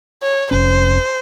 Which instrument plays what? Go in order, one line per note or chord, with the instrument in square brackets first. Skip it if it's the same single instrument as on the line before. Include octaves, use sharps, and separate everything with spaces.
[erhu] C#5
[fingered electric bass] F1 C#4 [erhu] C5